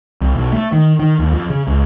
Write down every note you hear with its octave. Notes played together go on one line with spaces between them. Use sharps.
C2
B1
A3
D#3
D#3
D#2
F2
C#3
C#2